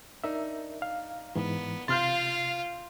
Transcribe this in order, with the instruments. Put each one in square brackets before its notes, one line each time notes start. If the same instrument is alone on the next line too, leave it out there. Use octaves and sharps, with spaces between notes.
[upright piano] D4 D#4 [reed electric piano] A#4 E5
[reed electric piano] F5
[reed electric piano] G#2 E3 [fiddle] B3
[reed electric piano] C3 A6 [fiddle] F4 F5 [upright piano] C6 F6 G6